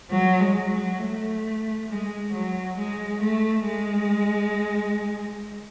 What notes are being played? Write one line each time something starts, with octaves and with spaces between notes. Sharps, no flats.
F#3
G#3
F#3
A3
G#3
F#3
G#3
A3
G#3